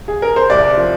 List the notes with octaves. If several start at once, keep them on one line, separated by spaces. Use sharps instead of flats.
G#4
A#4
C5
C2 D5
F3